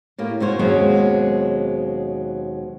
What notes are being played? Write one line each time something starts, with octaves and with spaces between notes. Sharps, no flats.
A2 A#3 G4
G#2 F#4 C5 C#5
D#2 B2 F#3 G#3 C4 C#4